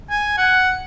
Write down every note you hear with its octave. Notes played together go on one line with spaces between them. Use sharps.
G#5
F#5